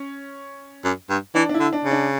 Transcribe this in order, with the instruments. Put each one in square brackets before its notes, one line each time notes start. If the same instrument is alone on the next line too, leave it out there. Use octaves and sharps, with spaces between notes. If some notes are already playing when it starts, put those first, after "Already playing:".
Already playing: [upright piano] C#4
[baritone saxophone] F#2
G2
[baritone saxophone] E3 [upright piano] D4
[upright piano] D4
E4
[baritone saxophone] D3
[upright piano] D4
[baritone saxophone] C#3
[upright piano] D4